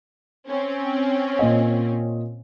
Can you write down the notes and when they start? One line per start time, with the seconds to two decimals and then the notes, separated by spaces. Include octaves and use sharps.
0.48 C4 C#4
1.39 A#2 D#5